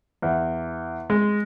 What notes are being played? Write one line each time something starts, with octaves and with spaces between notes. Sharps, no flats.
E2
G#3